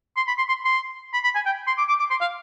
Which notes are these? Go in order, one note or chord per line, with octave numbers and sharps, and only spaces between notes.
C6
B5
C6
C6
C6
B5
B5
G#5
G5
C6
D6
D6
D6
C6
F5